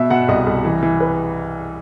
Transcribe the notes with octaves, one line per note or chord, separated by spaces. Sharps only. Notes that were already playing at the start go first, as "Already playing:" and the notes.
Already playing: B2 E5
B2 F#5
C2 D#5
C2
E3
E3
B4